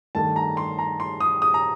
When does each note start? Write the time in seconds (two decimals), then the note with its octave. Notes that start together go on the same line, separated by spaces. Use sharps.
0.15 G2 D#3 A3 A5
0.36 A#5
0.57 C6
0.79 A#5
1.00 C6
1.20 D#6
1.42 D#6
1.54 A#5